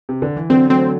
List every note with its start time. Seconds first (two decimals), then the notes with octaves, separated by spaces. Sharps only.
0.09 C3
0.22 D3
0.36 E3
0.49 D3 F#3 C4
0.70 F#3 A3 C4